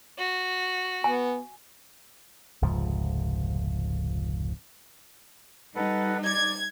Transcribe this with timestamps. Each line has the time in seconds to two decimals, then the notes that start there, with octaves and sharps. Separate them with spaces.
0.18 F#4
1.04 B3 G#5
2.62 F1 C#2 G#2 F3
5.76 G3 D#4 A4 B4 F#5
6.25 D5 G#6